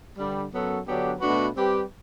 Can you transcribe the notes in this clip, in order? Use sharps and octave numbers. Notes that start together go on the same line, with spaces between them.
G2 D3 G3
F#2 F#3 B3 F#4 A4
D3 F#3 B3 D4 G4
B2 A3 D4 F#4 B4
G3 C4 G4 B4